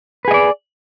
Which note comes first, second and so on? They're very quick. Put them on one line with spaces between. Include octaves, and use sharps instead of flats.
B4 G#4 D#5 D5